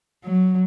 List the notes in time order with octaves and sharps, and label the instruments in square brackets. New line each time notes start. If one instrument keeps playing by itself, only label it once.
[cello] F#3